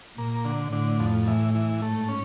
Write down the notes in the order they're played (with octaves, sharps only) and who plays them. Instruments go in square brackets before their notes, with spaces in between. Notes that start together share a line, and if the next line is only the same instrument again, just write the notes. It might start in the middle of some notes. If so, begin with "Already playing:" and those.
[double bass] A#2 [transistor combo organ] A#3
[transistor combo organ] D3
[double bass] A2 [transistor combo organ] D3
[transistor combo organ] F2
E3
E3
[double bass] G#2 [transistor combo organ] A3
[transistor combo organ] C#4